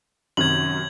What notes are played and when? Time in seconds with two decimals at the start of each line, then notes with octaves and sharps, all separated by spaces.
0.37 F#2 C3 D#3 G#6 F#7